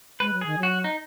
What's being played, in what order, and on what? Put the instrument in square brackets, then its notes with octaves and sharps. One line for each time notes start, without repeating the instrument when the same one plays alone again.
[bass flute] G#3 [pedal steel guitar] B4
[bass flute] F#3
[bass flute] D#3 [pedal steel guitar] G#4
[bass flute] F#3 [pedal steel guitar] F#4
[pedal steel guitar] D#4